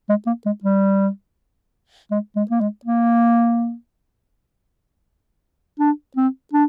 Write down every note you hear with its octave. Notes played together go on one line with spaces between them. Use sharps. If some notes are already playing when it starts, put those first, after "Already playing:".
G#3
A#3
G#3
G3
G#3
G#3
A#3
G#3
A#3
D4
C4
D4